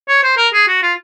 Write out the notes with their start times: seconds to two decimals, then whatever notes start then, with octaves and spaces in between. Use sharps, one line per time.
0.09 C#5
0.24 C5
0.38 A#4
0.53 G#4
0.68 F#4
0.83 F4